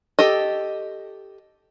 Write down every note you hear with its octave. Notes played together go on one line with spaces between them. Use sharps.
G4 A4 D#5